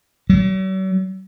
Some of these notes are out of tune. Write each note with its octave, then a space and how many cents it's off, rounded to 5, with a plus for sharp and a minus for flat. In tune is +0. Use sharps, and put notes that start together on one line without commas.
F#3 +45